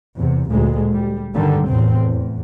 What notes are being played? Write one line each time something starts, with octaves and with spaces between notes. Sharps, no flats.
E2 C3
D2 A#2 G#3
G3
G2 D3 D#3 G3
F1 E2 A2 C3 C4
E2